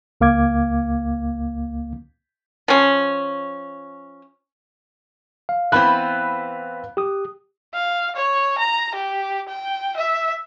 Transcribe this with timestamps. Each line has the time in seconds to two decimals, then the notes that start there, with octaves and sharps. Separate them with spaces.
0.21 C#2 A#3 F5 D6 G#6
2.68 F3 C#4
5.49 F5
5.72 E3 B3 C4 B5 F#6
6.97 G4 D#6
7.74 F5
8.16 C#5
8.58 A#5
8.94 G4
9.48 G5
9.96 E5